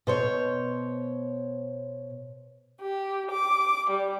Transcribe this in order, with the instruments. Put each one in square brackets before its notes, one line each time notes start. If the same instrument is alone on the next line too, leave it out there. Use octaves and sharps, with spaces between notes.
[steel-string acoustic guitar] B2 C5 C#5
[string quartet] G4
D6
G3